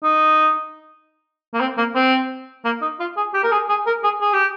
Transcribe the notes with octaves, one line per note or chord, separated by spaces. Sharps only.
D#4
A#3
C4
A#3
C4
A#3
D#4
F4
G#4
G4
A#4
G#4
G#4
A#4
G#4
G#4
G4